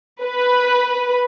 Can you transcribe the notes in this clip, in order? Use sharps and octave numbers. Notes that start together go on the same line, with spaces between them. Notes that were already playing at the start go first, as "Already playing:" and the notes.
B4